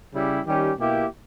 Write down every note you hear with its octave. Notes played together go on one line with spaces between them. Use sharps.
C#3 G3 C#4 E4 G4
D#3 G3 C#4 G4
B2 A#3 E4 G4